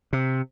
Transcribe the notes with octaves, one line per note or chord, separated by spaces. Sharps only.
C3